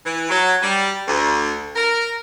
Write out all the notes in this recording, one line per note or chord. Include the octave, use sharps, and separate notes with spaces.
E3
F#3
G3
D2
A#4